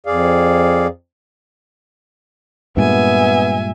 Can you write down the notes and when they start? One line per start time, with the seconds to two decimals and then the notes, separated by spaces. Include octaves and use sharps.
0.06 F2 G#4 D5 F5
2.77 G2 A#2 G#3 B3 E5 G#5